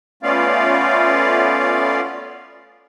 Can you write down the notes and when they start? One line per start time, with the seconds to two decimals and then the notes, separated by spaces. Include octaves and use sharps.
0.23 A3 B3 C#4 F4 D5 F5